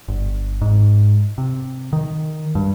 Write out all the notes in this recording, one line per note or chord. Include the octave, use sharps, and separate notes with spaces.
G1
G#2
C3
D#3
G2